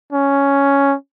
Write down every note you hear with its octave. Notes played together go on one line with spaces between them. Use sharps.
C#4